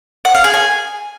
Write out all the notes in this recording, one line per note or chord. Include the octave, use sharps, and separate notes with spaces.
F#5
F5
G#4
G#5